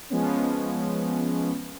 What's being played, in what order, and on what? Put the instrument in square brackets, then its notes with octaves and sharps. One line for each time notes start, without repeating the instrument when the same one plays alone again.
[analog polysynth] F3 G#3 B3 C#4